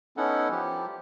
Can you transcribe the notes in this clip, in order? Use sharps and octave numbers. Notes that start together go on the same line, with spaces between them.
B3 C#4 D#4 E4 A4 F#5
F3 G4